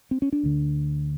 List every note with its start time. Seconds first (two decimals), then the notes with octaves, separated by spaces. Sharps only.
0.11 C4
0.22 C#4
0.33 D4
0.43 D2 D3